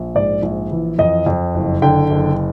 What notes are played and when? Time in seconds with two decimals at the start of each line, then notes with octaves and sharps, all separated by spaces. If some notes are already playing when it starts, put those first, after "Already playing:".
Already playing: A#1
0.15 G#2 D5
0.43 A#1
0.71 E3
0.99 F2 D#5
1.26 F2
1.54 F#1
1.82 D3 G5
2.10 F#1